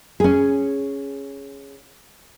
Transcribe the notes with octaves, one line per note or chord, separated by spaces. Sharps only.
C#4 G#4